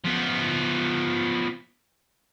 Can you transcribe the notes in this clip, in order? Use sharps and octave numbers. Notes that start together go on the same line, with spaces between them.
F3 B3